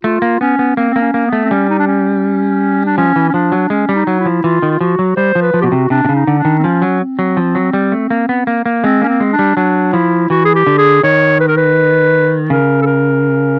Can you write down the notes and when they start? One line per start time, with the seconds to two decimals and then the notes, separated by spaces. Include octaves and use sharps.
0.04 A3 F4
0.22 A#3
0.41 B3 C#4
0.59 B3
0.77 A#3 C4
0.90 C4
0.96 A#3
1.01 C#4
1.14 A#3
1.27 B3
1.33 A3
1.45 C4
1.50 G3 C#4
1.70 D#4
1.79 D4
1.87 C#4
2.86 D4
2.97 F3 C#4
3.16 E3
3.29 C#4
3.34 F3 D4
3.52 F#3
3.70 G#3 C#4
3.89 G3
3.95 D#4
4.07 F#3
4.20 E4
4.26 F3
4.44 E3 F4
4.62 D#3
4.71 F4
4.81 F3 F#4
4.99 F#3
5.17 G3 C5
5.35 F3
5.42 B4
5.54 F3
5.61 B2 F#4 G4
5.72 C3
5.90 C3 D4
6.05 C3
6.09 C#3
6.15 D#4
6.27 D3
6.39 D4
6.45 D#3
6.59 C4
6.63 F3 C#4
6.82 F#3
7.01 C4
7.19 F#3
7.37 F3
7.55 F#3
7.73 G3
7.92 A3
8.10 A#3
8.29 B3
8.47 A#3
8.66 A#3
8.83 G#3 C4
9.02 A#3 C#4
9.08 C4
9.20 G#3
9.33 D4
9.39 G3
9.57 F#3 D4
9.93 F3 E4
10.30 E3 F#4
10.45 G#4
10.55 G4
10.67 D3
10.78 G#4
11.03 D#3 C#5
11.40 B4
11.48 A#4
11.57 B4
12.50 C#3 A#4
12.82 A4
12.86 A#4